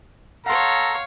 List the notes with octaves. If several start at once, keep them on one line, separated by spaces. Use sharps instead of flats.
A4 C#5 F5 F#5 A#5 C6